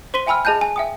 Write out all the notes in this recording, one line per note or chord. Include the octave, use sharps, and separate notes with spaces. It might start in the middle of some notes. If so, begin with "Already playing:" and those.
C5 C6 B6 D#7 G7
E5 G5 G#5 B5 E6 F6
G#4 D#5 A5 F#6 G6
G#5
E5 G5 D#6